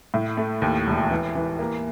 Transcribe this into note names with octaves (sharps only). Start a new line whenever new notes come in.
A2
A3
D#2
E1
E3
E3
A#3